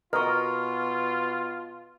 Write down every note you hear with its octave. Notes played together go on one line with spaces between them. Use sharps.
B2 F4 A#4 D#5 C#6 F6